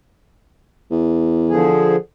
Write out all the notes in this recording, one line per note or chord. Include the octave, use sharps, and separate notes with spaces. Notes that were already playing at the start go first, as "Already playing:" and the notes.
E2
D3 F3 G#4